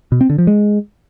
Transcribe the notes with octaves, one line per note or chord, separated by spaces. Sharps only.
B2
C4
D3
F3
G#3